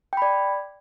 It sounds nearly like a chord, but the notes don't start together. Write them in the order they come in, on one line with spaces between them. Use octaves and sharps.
G5 B5 D5